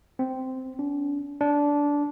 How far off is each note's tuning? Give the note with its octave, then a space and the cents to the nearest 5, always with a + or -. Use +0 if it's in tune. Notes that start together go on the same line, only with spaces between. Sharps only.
C4 -10
D4 -40
D4 -15